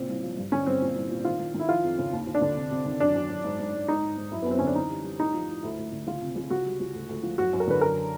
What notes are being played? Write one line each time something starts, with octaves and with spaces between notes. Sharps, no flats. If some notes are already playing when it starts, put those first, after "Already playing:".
Already playing: A#2 C#3 C4
C2
F3
G2
D3 C#4
G2 C4
A#2
C2
A#2
D#3 F4
D#3
D#3
E4
F3 F4
F2
C#3
D#2
D#2
D4
D3
C3
C3
D#3
F#2 D4
F#2
F#2
G#2
G#2
G#2
G#2 D#4
G#2
G#2
F#2 E4
B3
F#2 C4
D3 C#4
D4
E3 D#4
G3
G3
A2 D#4
F3
A2
D2 E4
D2
D3
C#2 F4
C3
C#2
C#2 F#4
G3
C#2
D2
D2
F3
F#2 F#4
F#2
A#4
D3 B4
F#2 A#4